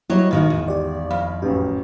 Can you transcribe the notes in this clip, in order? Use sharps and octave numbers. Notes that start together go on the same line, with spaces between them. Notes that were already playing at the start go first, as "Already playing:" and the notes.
F#3 G3 E4 G4 C#5 D#5
G#1 A#2 D#3 F#4
E2
G4 D5
F2 F5 B5
A1 F#2 G4